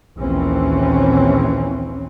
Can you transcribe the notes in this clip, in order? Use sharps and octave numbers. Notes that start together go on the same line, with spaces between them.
A#1 D#2 E3 C4 C#4